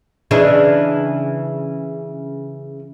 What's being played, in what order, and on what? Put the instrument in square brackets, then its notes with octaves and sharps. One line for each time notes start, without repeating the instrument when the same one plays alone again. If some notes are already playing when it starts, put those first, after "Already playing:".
[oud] C#3 E3 D4